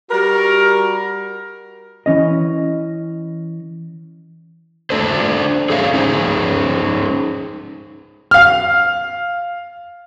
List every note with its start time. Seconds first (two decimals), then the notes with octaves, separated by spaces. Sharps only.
0.11 G3 F#4 A#4
2.06 E3 C#4 D#5
4.90 D4 A4 C5
5.70 G#4 A4 C5 C#5 E5 F5
5.94 C#4 D#4 G#4 C5
8.31 F5 F6